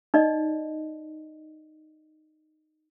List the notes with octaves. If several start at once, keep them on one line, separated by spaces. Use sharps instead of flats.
D#4 D5 D#5